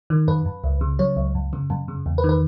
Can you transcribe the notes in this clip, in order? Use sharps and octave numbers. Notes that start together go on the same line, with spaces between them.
D#3
F#2 B4
F#2
C#2
C#3
F#3 C#5
C#2
F#2
C#3
F#2
C#3
E2
B4
D#3
B4